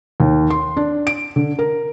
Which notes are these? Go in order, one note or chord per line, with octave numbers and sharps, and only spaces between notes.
D#2
C6
D4
D7
D3
A#4